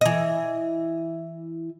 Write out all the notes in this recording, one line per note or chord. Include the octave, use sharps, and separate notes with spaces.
E3 D#5